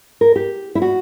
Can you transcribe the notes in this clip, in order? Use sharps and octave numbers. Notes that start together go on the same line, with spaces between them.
A#4
G4
E4
F#4